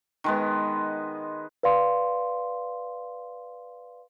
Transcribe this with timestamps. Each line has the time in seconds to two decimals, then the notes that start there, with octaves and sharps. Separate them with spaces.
0.24 D#3 G#3 B3
1.63 B4 D5 F5 C6